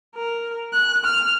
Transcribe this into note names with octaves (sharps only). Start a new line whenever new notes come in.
A#4
F#6
F6